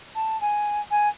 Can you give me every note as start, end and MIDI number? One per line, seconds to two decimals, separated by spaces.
0.15 0.39 81
0.41 0.81 80
0.91 1.08 80